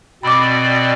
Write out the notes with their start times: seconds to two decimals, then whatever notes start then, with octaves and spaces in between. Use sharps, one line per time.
0.23 B2 C4 D5 B5 D6